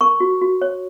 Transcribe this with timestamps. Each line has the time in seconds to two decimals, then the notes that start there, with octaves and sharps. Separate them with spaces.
0.01 A#4 C#6
0.20 F#4
0.42 F#4
0.62 C#5